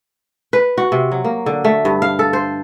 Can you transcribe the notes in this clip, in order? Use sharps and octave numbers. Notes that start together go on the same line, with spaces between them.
B4
F#4
C3
F#3
A#3
D3
A3
G2
F5
A4
C5